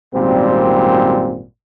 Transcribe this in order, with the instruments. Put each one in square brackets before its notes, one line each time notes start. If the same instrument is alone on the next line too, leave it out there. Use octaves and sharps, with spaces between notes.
[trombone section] G#1 F#2 A#2 G3 C4